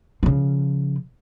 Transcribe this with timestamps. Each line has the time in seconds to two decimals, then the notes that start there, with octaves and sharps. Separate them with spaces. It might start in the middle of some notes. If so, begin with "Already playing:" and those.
0.23 C#3 F3